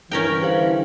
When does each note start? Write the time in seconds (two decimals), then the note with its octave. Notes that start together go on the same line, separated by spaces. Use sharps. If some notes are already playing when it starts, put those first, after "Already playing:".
0.11 G2 D3 E3 C#4 A#4 G5
0.42 G4 C5 F5